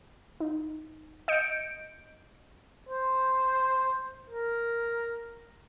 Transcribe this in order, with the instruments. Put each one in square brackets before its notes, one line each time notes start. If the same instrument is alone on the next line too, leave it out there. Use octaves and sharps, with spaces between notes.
[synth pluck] D#4
D#5 G6 C#7 D7
[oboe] C5
A#4